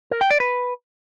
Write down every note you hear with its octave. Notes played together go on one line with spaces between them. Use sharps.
A#4
G5
D5
B4